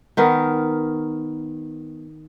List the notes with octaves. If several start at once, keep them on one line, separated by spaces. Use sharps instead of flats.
D#3 B3 A#4